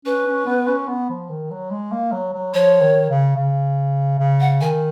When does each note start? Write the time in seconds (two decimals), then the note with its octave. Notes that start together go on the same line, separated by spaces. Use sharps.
0.05 C#4 B4
0.26 C#4
0.46 B3
0.67 C#4
0.88 B3
1.10 F3
1.30 D#3
1.51 F#3
1.71 G#3
1.92 A#3
2.12 F#3
2.33 F#3
2.54 F3 C#5
2.81 D#3
3.10 C#3
3.36 C#3
4.19 C#3
4.40 F#5
4.61 D#3 G#5